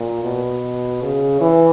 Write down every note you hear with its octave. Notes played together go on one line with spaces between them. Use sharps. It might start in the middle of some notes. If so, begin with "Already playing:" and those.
Already playing: A#2
B2
C#3
E3